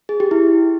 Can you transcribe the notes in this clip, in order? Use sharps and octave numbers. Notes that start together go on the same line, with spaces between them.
G#4
G4
E4